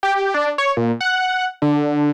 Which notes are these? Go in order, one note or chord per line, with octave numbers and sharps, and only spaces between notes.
G4
D4
C#5
A#2
F#5
D3